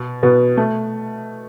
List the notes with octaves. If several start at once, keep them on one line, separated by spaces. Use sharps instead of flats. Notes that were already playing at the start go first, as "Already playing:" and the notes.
Already playing: B2
B2 B3
A3